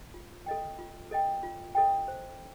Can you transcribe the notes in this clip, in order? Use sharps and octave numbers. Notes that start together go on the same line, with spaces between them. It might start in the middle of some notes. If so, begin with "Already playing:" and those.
F4
A4 D#5 G5
F4
A4 D#5 G5
F4
A4 D#5 G5
C5